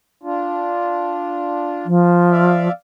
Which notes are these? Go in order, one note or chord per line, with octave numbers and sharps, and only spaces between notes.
D4 F4
F3
D5 E5 F5